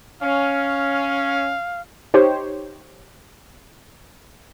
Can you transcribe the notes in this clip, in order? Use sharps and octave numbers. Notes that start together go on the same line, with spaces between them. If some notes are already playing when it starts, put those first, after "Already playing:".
C#4 F5
D#4 G4 C5 C#5